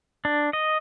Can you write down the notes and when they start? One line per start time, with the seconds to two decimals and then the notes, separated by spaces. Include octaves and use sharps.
0.25 D4
0.53 D#5